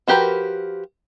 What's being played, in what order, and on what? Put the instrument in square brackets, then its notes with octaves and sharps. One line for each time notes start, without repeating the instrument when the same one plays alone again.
[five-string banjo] F3 F#4 G4 A#4 B4